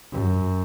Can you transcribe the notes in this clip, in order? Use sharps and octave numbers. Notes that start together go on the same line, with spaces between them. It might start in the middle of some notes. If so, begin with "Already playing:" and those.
F#2